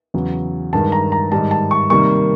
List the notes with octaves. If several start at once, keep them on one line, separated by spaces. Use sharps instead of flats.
E2 C#3 F#3
G2 D#3 G#3 A5
A#5
A#5
G#2 D#3 G3 A5
A5
C#6
C3 D#3 G3 A#3 C#6